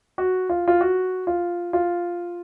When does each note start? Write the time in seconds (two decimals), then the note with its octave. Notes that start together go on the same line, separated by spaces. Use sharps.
0.18 F#4
0.49 F4
0.68 F4
0.81 F#4
1.27 F4
1.73 F4